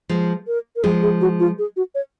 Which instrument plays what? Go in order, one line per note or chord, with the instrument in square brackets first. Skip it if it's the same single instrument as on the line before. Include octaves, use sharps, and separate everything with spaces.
[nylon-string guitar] F3 G#3
[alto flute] A#4
A#4
[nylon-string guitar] F3 G#3 [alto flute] G#4
[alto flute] G#4
F#4
F4
G#4
F#4
C#5